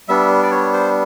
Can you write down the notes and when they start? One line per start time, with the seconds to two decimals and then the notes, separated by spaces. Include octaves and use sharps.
0.08 G3 B3 D4 E5
0.43 D5
0.51 C#5
0.73 C5